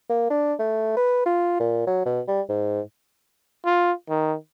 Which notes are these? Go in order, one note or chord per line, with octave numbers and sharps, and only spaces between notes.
A#3
D4
A3
B4
F4
A#2
F#3
B2
G3
G#2
F4
D#3